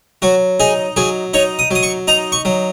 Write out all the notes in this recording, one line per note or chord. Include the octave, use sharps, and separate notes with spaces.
F#3 F#4
D#4 G#4
F#3 G#4
D#4 C#5
D#6
F#3 D#6
C#6
D#4 A#5
C#6
F#3